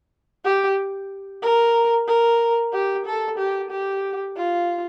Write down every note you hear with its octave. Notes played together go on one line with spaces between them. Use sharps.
G4
A#4
A#4
G4
A4
G4
G4
F4